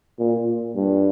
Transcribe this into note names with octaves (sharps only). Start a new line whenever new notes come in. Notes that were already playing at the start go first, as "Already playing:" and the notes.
A#2
G2